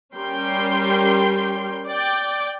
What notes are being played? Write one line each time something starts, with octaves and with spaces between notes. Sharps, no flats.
G3 C#4 A#4 G5 C6
D5 G5